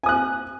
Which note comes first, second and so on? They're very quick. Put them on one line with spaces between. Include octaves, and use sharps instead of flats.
G#5 D#6 F#6